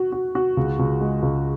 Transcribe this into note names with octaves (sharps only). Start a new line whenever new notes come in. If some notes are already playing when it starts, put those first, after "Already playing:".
Already playing: F#4
F#4
F#4
C#2
C#2
G#3
C#2